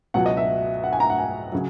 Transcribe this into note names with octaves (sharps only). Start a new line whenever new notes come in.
C#2 B2 F#3 F#5
D#5
E5
F#5
G#5
A#5
F#5
G#5
C#3 F#3